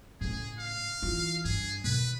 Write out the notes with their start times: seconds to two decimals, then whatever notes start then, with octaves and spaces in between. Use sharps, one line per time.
0.21 A2 C#3 G#4
0.58 F5
1.02 E3 F4
1.45 G2 G#4
1.84 B2 D#3 B4